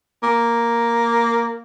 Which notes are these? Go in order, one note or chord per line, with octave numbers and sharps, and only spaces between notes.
A#3